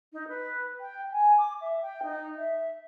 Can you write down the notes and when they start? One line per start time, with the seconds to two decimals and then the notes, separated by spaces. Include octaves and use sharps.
0.13 D#4
0.28 B4
0.80 G5
1.12 G#5
1.38 D6
1.61 E5
1.82 G5
2.03 D#4
2.37 E5